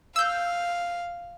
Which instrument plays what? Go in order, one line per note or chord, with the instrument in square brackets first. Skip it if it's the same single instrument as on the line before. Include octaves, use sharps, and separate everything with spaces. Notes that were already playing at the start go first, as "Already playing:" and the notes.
[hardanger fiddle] F5 [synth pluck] E6 G6